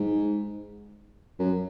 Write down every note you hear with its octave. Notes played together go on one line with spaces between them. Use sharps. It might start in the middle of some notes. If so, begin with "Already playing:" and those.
Already playing: G#2
F#2